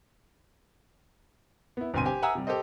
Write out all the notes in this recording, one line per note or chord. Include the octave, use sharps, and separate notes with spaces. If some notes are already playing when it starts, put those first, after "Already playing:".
B3 E4
G1 B2 C4 G#5 C6 D#7
G4 C5 G#5
E5 F#5 G#5 A#5 D#6 E6
C3 G3
G4 A4 C5 D#5